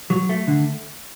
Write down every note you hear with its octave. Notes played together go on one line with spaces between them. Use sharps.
F#3
A3
D3